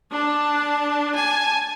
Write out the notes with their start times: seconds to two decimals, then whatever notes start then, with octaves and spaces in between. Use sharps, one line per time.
0.11 D4 A5
1.15 G#5 A5